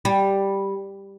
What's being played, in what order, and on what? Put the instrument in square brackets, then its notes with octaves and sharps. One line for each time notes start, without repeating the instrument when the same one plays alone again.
[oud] G3